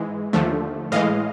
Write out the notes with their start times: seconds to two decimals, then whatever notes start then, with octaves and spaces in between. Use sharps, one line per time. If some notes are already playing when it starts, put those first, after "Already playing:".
Already playing: G#2 E3 G#3
0.33 D#2 D3 F3 A3
0.92 A2 E3 G#3 D#5 F5